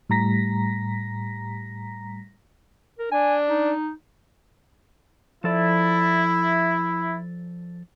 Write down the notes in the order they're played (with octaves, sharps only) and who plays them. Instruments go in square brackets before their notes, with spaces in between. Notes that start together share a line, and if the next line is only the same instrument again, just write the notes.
[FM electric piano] A2 G3 A#5 A#6 B6
[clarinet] A#4
[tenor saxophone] D4 [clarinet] G#5
[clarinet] D#4
[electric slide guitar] F3 A4 D5 [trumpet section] E4